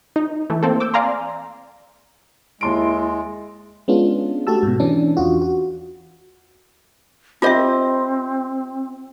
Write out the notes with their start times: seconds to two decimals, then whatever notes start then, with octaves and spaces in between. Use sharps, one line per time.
0.16 D#4
0.50 E3 A3
0.63 A#3 C4 A4
0.80 D6 E6 G6
0.94 D5 F5 G#5 A#5 C6
2.61 D#2 G#3 E4 C6 D7
3.88 G#3 B3 C#4 D4 F4
4.47 A3 F#4 G4 A5 E6
4.63 G#2 B2
4.80 E3 C#4 D4
5.17 E2 F4 F#4
5.42 F#4
7.42 C4 F4 G4 C5 D#5 E5